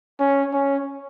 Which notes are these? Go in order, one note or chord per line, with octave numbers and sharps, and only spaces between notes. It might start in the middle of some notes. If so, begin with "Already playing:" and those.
C#4
C#4